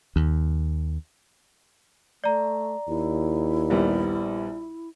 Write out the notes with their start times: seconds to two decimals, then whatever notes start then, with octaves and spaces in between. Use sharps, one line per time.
0.16 D#2
2.24 A3 D5 A#5
2.88 D#2 E4
3.70 A#1 G3 B3